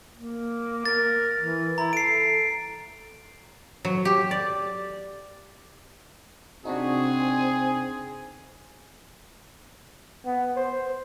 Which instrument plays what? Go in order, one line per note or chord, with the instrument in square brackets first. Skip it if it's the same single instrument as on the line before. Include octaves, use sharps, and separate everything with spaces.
[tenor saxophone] A#3
[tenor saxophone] A#4 [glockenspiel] A6
[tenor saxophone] E3
[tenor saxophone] E4 [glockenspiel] A#5
[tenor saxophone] A4 [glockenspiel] C7 D7
[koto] F#3
G4
D5
[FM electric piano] C3 D4 D#4 [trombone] C4 [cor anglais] F#4 [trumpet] G#4
[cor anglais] G#5
[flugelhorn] B3
C5